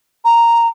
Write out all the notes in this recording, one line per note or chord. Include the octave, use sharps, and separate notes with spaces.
A#5